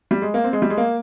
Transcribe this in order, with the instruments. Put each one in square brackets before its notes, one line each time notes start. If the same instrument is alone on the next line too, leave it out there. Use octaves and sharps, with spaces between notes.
[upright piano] G3
G#3
A#3
C4
G#3
G3
G#3
A#3